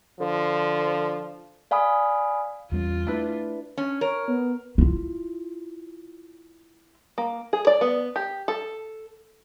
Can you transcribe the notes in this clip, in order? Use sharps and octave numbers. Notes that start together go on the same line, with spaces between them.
D3 F3
D5 F5 G#5 B5 D#6
E2 G3 C#4 F4
A3 D4 E4 B4
C#4
A#4 C#5
B3
E4 F4
A#3
G#4
D5
B3
G4
A4